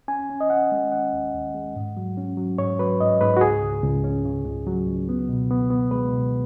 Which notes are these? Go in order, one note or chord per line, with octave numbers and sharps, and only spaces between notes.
C#4 G#5
C#4
D#5
C#4 F#5
G#3
C#4 F#5
D#2
D#2
G#3
G#2
F#3
C#4
F#3
G#2 C#5
F#3 B4
G#2 D#5
G#2 B4
F#4
C#2 G#4
C#2
C#2
C#4
C#3
C#2
F#3
C#2
B3
B2
B3
B3
G#3 B4
B2